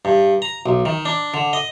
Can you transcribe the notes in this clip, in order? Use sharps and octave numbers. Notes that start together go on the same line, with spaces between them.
G2
A#5
B1
D#3
D4
D3
D#5